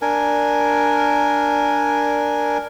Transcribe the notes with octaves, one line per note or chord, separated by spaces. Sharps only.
D4 A#4 G#5